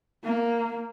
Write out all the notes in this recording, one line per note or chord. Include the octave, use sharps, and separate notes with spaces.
A#3